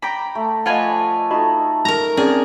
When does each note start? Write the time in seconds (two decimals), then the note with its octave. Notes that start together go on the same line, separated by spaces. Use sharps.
0.02 D5 G5 A#5 B5
0.35 A3
0.66 F3 A3 F4 B4 D#5 F#5 G#5
1.31 D#4 F#4 A4 D#5 B5
1.85 A#4 A#5
2.17 C4 C#4 G#4 D5